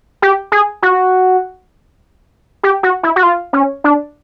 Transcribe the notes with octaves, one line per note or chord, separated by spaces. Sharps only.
G4
G#4
F#4
G4
F#4
E4
F#4
F4
C#4
D4